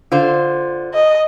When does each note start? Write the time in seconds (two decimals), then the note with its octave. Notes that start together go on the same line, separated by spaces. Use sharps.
0.12 D3 F4 C5
0.94 D#5